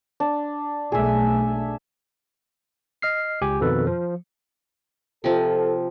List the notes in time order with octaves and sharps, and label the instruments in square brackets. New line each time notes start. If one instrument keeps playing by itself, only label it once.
[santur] D4
[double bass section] B1 A3 [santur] G#4 E5
[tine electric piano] D#5 F6 C7
C#2 G4 G#5
F2 B2 D#3 A4 B4
F3
[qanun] C3 F3 [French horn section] A4